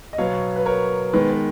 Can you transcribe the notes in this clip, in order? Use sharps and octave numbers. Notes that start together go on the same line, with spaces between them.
D#5
B2 F#3 B3 C#5 F5
B4
A#4 C#5
D#3 G#3 B3 B4
B4